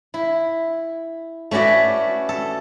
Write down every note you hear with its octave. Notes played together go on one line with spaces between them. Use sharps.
E4
A3 C#4 F#4 B4 D5
A4